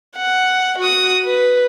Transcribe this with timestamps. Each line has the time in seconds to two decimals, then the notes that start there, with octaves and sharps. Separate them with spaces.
0.16 F#5
0.79 F#4 D#6
1.25 B4